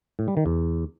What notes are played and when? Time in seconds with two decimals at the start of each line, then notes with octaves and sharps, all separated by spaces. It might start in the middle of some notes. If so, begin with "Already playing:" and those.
0.19 A2
0.28 G3
0.37 D#3
0.46 E2